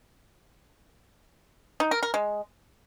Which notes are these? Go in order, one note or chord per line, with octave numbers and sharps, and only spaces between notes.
D#4
A#4
A#4
G#3